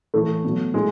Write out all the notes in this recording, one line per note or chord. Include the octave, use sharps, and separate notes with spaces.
A2 E3 A3
B2 F#3
A2 G#3